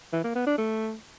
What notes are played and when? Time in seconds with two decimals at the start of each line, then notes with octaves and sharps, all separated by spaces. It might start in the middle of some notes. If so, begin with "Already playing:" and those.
0.13 E3
0.24 A#3
0.35 B3
0.47 D4
0.58 A3